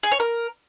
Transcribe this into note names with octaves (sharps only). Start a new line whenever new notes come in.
G#4
C#5
A#4